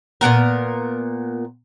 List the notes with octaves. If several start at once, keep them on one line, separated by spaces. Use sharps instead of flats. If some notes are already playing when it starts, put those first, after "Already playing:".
A#2 D#3 B3 A#4